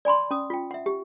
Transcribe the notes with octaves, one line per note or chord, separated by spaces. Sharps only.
D5 G#5 B5 C6
C#4 D#6
F4 G5
E5 F#5
G4